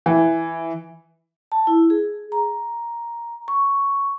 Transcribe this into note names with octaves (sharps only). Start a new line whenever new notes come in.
E3
A5
E4
G#4
A#5
C#6